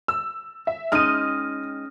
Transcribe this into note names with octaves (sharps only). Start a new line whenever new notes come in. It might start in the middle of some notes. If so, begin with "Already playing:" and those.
E6
E5
G#3 C#4 D#4 D#5 D#6 F6 A#6 D#7